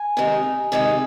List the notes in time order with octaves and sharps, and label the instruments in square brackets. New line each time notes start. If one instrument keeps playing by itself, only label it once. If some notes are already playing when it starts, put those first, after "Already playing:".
Already playing: [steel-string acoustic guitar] G#5
C3 D#3 G#3 D#4
C3 D#3 G#3 D#4